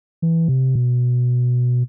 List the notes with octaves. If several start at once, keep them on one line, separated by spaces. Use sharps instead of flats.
E3
C3
B2